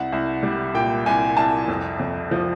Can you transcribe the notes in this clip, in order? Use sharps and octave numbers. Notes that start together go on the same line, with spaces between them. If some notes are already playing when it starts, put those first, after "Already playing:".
Already playing: C2 F#5
C2
G3
A#2 G5
C2 G#5
C2 A5
F2
F2
F3